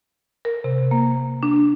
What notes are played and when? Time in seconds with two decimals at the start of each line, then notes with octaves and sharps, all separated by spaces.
0.45 A#4
0.64 C3
0.91 A#3
1.43 D4